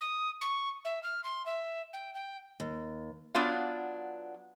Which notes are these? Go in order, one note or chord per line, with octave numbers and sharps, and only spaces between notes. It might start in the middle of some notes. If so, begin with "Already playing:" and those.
D#6
C#6
E5
F6
C6
E5
G5
G5
D#2
F#3 B3 D4 F4 F5